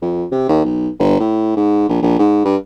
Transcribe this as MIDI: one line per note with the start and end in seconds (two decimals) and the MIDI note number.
0.02 0.24 41
0.31 0.47 48
0.48 0.61 39
0.64 0.88 35
0.99 1.20 31
1.20 1.53 45
1.56 1.85 44
1.89 2.02 34
2.02 2.17 34
2.19 2.40 44
2.45 2.56 43